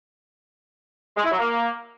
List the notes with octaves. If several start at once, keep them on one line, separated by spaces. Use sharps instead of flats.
G#3
E4
F#3
A#3